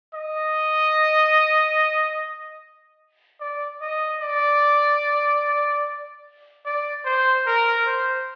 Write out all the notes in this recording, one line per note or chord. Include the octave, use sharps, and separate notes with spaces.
D#5
D5
D#5
D5
D5
C5
A#4
C5